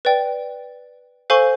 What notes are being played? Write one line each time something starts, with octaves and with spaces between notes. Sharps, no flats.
B4 D5 G5
A4 C5 F5 G#5 C#6